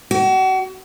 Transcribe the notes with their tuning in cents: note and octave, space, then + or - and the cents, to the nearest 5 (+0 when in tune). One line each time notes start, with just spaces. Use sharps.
F#4 +35